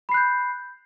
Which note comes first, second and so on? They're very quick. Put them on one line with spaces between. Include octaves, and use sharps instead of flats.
B5 C7 F#6 G6